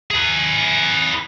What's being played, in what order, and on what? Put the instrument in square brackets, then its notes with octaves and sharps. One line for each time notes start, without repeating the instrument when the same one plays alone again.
[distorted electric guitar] G#4 B4